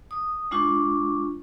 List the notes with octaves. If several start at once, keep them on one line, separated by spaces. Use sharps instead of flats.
D#6
G#3 D4 F4 C#6